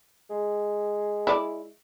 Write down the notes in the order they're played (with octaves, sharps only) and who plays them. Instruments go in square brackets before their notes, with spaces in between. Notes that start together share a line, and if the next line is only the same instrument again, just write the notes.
[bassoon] G#3
[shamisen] E4 D5